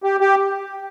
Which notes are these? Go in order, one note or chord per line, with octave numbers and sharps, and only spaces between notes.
G4
G4